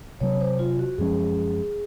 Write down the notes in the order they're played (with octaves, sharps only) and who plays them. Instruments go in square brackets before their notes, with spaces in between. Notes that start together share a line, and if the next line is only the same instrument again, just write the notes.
[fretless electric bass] C3 F#3 C4 [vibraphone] C#5
[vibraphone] C5
F4
F#4
[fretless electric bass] F#2 F3 G#3 C#4 [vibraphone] G#4